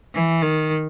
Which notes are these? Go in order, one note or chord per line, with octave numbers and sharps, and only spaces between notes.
E3
D#3